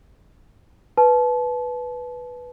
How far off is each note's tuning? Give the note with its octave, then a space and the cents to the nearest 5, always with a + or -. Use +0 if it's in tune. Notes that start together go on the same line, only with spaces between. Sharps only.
B4 +0 A5 -30